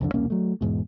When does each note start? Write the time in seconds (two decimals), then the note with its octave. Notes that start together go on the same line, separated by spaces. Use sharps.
0.01 C2 F2 D3
0.14 E1 C2 A#3 C#4
0.30 F#3 A3
0.61 E2 G#2 B2